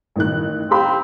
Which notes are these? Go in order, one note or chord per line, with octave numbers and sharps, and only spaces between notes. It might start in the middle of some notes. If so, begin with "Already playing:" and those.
A1 D#3 F#6
C4 G4 F5 B5